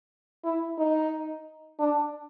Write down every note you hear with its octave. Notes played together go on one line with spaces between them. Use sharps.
E4
D#4
D4